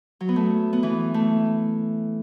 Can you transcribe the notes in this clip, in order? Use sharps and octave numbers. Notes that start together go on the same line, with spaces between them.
F#3
B3
A3
B3
E3
A3